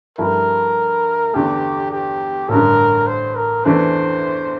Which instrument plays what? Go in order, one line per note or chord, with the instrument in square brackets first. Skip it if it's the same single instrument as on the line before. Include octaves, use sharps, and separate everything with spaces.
[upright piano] G2 F3 A3 E4 G4 [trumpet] A#4
[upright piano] E2 D3 A3 [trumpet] G4
[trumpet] G4
[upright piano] A1 G2 D3 [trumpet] A#4
[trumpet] C5
A#4
[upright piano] E2 E3 A3 D4 [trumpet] C5